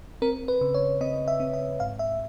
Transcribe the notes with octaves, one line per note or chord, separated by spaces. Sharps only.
C4 A#4
B4
C#3
C#5
C4 D#5
E5
C4
E5
G#2 F5
E5